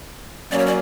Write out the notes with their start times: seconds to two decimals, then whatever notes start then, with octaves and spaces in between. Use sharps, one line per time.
0.51 F#3 A#3 C#4 D5
0.58 C#5
0.66 D5